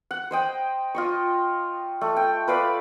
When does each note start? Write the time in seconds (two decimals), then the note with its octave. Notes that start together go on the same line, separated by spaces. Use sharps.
0.11 F#5
0.31 C5 D#5 G5
0.95 F4 D#5 C#6
2.01 A3
2.16 G5
2.48 B4 D5 F5 B5